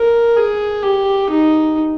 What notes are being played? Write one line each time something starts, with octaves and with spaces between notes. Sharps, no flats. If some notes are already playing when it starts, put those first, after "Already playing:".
Already playing: A#4
G#4
G4
D#4